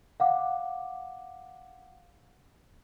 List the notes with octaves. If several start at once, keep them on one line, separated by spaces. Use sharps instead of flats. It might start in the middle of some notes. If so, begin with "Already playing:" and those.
F5 F#5 D6